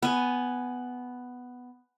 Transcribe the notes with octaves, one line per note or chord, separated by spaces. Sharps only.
B3 G#5